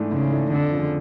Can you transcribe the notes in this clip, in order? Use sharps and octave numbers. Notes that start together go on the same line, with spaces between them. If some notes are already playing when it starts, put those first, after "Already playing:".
Already playing: G#2 E3 A3 D4
G#2 C#3
E3 A3 D4
F2 D3
C#3 F3